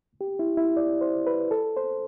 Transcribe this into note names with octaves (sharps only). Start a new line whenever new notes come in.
G4
E4
E4
D5
C5
B4
A4
C5